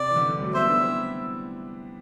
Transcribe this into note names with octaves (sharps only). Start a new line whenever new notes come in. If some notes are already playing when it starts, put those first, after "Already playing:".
Already playing: C3 D5
E3
D3
D3
G3
F#3 A3
G3 B3 C5 E5
B3 D4
C4 E4